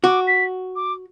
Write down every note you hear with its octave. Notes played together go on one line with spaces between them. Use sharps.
F#4 D6
B6
D6